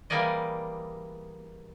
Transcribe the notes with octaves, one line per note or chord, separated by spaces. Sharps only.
E3 G3 A#3 G#4 D5 D#5